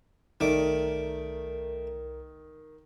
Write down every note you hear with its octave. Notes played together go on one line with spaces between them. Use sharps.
C2 D#3 A3 A#4 D5 D6